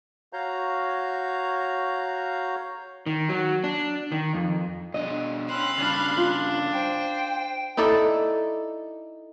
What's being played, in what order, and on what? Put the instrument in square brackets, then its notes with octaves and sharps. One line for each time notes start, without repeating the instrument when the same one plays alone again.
[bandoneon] F#4 C#5 F5 A#5 G6
[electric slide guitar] D#3
F#3
D4
D#3
F2
[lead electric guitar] B2 D4 [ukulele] D#5
[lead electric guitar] C#4 C5 [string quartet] F5 B5 F#6
[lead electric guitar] G2 C#3 [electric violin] D4
[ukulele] F4
[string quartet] C5 [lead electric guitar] G5
[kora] D#4 E4 A4 D5